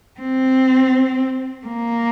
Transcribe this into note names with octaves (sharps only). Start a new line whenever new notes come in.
C4
A#3